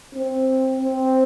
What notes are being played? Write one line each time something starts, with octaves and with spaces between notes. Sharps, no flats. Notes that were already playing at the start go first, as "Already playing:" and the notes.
C4
C4